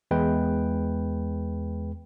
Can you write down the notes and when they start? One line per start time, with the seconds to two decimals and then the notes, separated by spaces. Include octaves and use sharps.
0.11 E2 G#3 B4 G5